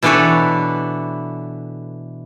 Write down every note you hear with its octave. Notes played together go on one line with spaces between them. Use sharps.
B2 E3 D4 A4 B4 C#5